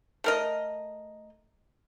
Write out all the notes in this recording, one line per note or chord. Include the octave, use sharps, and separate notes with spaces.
A3 A#4 D#5